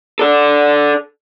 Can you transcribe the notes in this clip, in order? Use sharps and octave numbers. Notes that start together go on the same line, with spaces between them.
A4 D5